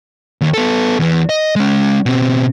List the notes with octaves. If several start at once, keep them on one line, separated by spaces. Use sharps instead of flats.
D#2
B3 A4
E2 E3
D#5
G#3 C#4
B2 C4